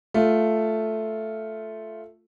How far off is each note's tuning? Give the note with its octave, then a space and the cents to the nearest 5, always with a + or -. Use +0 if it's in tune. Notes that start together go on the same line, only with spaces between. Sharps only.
A3 +0 F4 +0